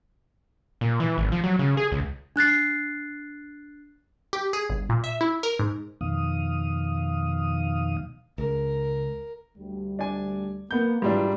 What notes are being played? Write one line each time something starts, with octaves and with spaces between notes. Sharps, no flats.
A#2
E3
G#1
F3
F#3
C#3
G#4
C#2
D4 F#6 A6 C7
G4
G#4
G1
A#2
E5
E4
A#4
G#2
F2 B2 D#3 F5 D#6
C#2 A#4
D2 G3
D4 D5 G#5
A#3 B3 G6
G#2 E3 G3 D4 F4